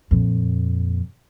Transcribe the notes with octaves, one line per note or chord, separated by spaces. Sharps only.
F2 A#2